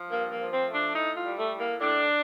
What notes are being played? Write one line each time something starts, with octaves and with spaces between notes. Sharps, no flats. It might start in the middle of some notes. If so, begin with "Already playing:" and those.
Already playing: F3
G2 A#3
A#3
F3
C4
A3
D4
A2 D#4
F4
G3
A3
A2
A#3
A2 D4